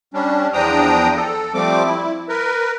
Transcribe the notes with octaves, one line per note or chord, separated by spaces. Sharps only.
G3 C#4 D4
E2 F3 D4 G5 A#5 D#6
A4
F3 G3 A3 C4 D6
E4
A#4 B4